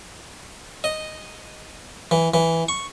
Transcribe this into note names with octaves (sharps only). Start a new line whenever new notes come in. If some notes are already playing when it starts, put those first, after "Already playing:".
D#5
E3
E3
C#6